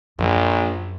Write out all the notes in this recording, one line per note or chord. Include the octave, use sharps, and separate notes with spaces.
A#1 F#2